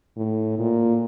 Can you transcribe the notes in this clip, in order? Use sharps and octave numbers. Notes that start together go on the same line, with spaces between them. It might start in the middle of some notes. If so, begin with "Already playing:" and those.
A2
A#2